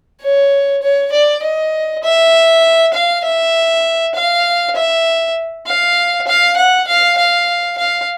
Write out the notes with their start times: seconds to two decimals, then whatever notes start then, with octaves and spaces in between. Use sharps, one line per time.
0.21 C#5
0.82 C#5
1.12 D5
1.43 D#5
2.03 E5
2.94 F5
3.24 E5
4.15 F5
4.76 E5
5.66 F5
6.27 F5
6.57 F#5
6.87 F5
7.17 F5
7.78 F5